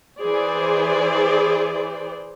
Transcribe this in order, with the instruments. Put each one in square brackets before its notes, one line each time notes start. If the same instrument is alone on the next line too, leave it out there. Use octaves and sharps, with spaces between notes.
[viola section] E3 G#4 C5 D5